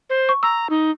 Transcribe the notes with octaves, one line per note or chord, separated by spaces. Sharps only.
C5
C#6
A#5 E6
D#4